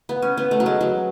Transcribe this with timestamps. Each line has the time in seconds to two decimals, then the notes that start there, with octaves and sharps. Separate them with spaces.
0.09 B3
0.22 C#4
0.37 B3
0.51 A3
0.60 F#3
0.66 G#3
0.81 F#3